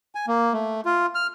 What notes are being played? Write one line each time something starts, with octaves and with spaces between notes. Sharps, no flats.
G#5
A#3
A3
F4
F6